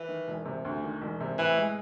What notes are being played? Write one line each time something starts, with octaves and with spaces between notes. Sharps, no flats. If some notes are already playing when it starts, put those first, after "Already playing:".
Already playing: E3
D#3
E1
C3
D2
D#3
E1
C3
A2 E3
G#3